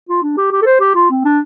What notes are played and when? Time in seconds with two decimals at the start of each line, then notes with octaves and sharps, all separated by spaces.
0.09 F4
0.23 D4
0.37 G4
0.52 G4
0.62 A4
0.66 C5
0.80 G4
0.95 F4
1.10 C4
1.25 D4